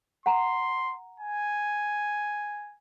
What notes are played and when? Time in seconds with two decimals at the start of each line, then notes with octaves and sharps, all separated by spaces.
0.26 F#5 A#5 C6
1.20 G#5